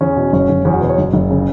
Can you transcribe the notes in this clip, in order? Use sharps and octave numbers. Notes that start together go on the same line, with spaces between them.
E2 C#4
B2
F#1 C#4
F#1
E2 C#4
F#4
B2 B4
C#5
F#1
F#1
C#3